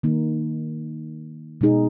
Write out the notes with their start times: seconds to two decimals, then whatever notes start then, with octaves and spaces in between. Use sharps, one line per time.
0.03 D#3 A#3 D#4
1.61 B2 G#3 D#4 G#4